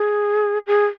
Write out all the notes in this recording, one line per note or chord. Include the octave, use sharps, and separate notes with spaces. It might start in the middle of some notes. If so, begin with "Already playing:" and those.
Already playing: G#4
G#4